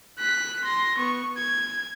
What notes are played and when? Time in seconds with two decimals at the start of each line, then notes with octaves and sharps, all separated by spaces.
0.19 F#6 B6
0.65 C6 A#6
0.98 B3 C#6
1.37 G#6